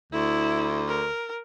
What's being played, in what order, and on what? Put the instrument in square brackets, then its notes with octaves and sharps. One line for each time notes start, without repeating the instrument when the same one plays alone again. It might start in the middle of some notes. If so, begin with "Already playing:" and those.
[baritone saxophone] D2 [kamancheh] E4
[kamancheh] A#4